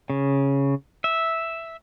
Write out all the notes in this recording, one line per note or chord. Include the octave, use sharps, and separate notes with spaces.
C#3
E5